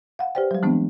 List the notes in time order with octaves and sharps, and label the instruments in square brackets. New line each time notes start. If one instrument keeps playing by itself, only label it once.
[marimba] F5 F#5
G4 B4 C5 D5 G5
F#3 G3
E3 G#3 B3 C4 D4